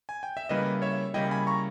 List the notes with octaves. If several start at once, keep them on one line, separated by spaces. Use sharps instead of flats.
G#5
G5
E5
C#3 G3 A#3 E4 B4 D#5
C#5 E5
C#3 G3 A#3 E4 D#5 G5
G#5 B5
A#5 C#6